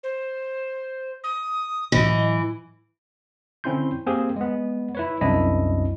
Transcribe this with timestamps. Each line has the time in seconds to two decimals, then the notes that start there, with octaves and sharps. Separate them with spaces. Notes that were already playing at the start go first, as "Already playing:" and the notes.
0.03 C5
1.24 D#6
1.92 A2 E3 F#3 D#5
3.64 D3 C4 C#4 E4 C6 G6
4.06 A#3 C4 G4 G#4
4.36 G#3 B3
4.95 E4 B4 C#5
5.21 C2 F#2 C4 D4 E4 D#5